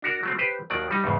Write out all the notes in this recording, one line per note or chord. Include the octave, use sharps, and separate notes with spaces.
D4 F#4 A#4
F#3 A3 C4
G4 B4 C5
D#2 D#3 F#3 D5
G3 D#4
E2 G#2 C#3